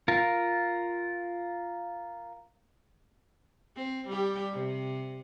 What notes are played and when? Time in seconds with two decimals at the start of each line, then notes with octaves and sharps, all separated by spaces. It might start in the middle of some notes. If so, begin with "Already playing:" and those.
0.08 F4 A#4
3.76 C4
4.07 G3 G4
4.52 C3